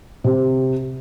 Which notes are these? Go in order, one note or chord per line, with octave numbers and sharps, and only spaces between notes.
C3